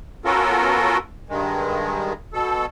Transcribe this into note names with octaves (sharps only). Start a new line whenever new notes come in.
B3 C#4 F4 F#4 A4 A#4
G2 D#3 G#3
B2 A4